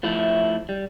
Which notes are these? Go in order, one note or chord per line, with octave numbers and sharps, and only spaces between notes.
F3 A3 E4
G3